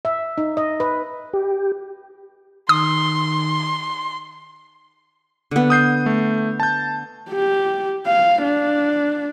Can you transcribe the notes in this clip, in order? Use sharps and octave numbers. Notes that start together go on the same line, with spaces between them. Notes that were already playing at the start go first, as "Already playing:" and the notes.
E5
D#4
D#5
B4
G4
D#3 C6 D#6
D3 B3
D#6 G6 C7
A3
A5 G6
G4
F5
D4